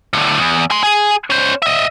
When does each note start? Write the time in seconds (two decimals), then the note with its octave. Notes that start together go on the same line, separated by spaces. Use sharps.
0.13 A2 D3
0.39 E2
0.71 G#5 C6
0.83 G#4
1.30 C#4 C5
1.62 D#5 E5